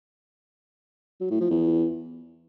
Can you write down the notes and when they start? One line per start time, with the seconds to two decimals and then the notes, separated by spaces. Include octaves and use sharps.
1.21 F#3
1.30 A2
1.40 F3
1.50 E2